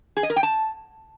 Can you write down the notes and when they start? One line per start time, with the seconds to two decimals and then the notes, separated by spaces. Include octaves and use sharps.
0.17 G#4
0.23 D#5
0.30 A#4
0.36 G5
0.43 A5